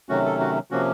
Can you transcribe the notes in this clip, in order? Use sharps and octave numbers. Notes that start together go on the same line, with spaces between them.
C3 D#3 F#3 A3 C#4 F#4
A4
F#4
C3 F3 A#3 C#4 F#4